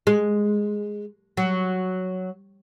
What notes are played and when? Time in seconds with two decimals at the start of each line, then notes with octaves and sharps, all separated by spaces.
0.07 G#3
1.37 F#3